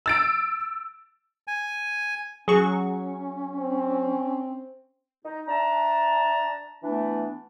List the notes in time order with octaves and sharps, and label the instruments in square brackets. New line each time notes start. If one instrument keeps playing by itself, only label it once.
[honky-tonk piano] E6 A6 D7
[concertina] G#5
[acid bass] F#3 [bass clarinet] C#4 [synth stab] G#4 C#6
[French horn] C4
[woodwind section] D#4
D4 E5 A5 A#5
E3 A3 B3 D4